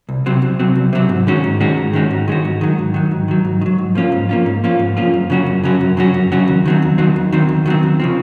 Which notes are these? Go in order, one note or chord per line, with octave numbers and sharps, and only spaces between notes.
C2
C3 F#3 C4
C2
C3 F#3 C4
C2
C3 F#3 C4
G#2
D#3 G#3 C#4 F#4
G#2
D#3 G#3 C#4 F#4
G#2
D#3 G#3 C#4 F#4
G#2
D#3 G#3 C#4 F#4
G#2
D#3 F#3
G#2
D#3 F#3
G#2
D#3 F#3
G#2
D#3
F#3
G#2
F3 A#3 C#4 F4
G#2
F3 A#3 C#4 F4
G#2
F3 A#3 C#4 F4
G#2
F3 A#3 C#4 F4
F#2
C#3 F#3 C#4 F#4
F#2
C#3 F#3 C#4 F#4
F#2
C#3 F#3 C#4 F#4
F#2
C#3 F#3 C#4 F#4
D#2
D#3 F#3 C4
D#2
D#3 F#3 C4
D#2
D#3 F#3 C4
D#2
D#3 F#3 C4
D#2
C#3 F3 C4